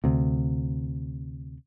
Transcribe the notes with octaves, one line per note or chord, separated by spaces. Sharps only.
D2 C3